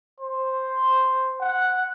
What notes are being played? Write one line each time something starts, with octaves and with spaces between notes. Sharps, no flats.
C5
F#5